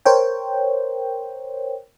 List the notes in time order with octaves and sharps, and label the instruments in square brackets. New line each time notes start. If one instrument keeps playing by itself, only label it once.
[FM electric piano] A#4 C5 C#5 G5